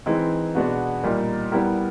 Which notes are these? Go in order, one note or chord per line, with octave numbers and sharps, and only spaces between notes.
E3 G#3 C4 D#4
B2 G#3 B3 D4 F#4
A#2 G3 A#3 D#4
G3 B3 E4 G4 A#4